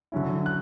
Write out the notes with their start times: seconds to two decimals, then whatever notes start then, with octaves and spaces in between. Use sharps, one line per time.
0.12 D3 F#3 C#4 E4
0.46 F#6